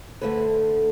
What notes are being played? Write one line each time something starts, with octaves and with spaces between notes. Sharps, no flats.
D2 D3 A3 B4